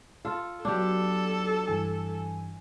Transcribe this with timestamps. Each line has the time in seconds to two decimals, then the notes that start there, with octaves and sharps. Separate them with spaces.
0.25 F4 A4
0.65 F#3 B3 D4 G4 A4
1.67 G2 E3 G#5